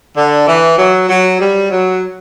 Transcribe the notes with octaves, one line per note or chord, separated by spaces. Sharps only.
D3
E3
F#3
F#3
G3
F#3